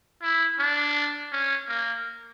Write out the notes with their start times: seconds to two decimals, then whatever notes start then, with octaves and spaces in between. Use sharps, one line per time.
0.22 E4
0.59 D4
1.32 C#4
1.69 A#3